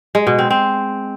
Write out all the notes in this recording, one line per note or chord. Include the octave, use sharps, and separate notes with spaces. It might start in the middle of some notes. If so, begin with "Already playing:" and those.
G#3
B2
C4
C4